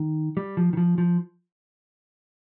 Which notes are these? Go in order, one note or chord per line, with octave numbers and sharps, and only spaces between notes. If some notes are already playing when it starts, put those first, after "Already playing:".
Already playing: D#3
G3
F3
D#3
F3
F3